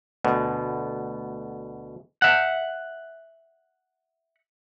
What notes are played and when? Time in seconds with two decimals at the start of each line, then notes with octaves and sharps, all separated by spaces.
0.24 D2 B2
2.22 E5 F#5